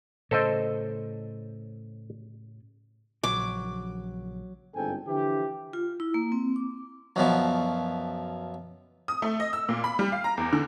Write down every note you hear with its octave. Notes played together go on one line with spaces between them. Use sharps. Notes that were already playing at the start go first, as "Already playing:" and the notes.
A2 C#3 A4 C5 D#5
A#1 C#3 F3 F#3 D6
G1 G#2 C4 A4 G5 G#5
D3 E3 F3 G4
F4
E4
A#3
C4
D6
F#2 B2 F3
D#6
A3
D#5
E6
A#2
B5
G3
F5
A#5
E2
D3